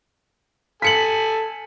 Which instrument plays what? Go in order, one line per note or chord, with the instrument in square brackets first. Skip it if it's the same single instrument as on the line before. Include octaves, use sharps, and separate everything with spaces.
[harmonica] A4 G#5 [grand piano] B6 C#7 F#7